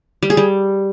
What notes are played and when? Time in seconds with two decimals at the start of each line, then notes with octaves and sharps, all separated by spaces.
0.23 G3
0.30 G#4
0.37 G3